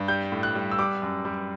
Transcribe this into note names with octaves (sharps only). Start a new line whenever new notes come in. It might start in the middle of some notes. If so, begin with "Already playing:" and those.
Already playing: G2
G3 G6
A2
F#6
G3
E6
G3 D6
F#2
G3